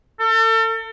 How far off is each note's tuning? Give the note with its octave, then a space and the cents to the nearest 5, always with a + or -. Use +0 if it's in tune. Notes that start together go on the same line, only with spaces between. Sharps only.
A4 +35